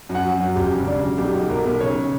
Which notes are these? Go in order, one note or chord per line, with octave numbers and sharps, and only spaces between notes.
F#2
F#5
F#3
F#2
E1 G4
C#3
C#3 D4
F#3
B1 G4
B2
B1 A#4
B1
C#3 C#5
C#3